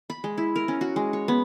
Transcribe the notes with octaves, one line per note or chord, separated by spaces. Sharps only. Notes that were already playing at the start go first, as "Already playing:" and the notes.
B5
G#3
E4
A#4
C#4
F#4
G#3
C#5
B3